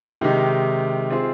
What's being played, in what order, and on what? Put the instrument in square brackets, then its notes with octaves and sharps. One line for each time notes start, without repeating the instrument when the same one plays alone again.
[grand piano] C3 D#3 G#3 D#4 G4
C4 F4 G#4 C5